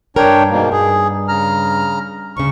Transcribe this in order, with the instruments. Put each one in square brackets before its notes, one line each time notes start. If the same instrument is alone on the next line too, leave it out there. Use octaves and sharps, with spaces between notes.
[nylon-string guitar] G2 A#4 [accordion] D4 C#5 G5
[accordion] G#2 B2 A#3
[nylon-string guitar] G2 [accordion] G#4
[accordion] C#3 A#5 F6
[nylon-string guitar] D2 C#3 [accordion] C#6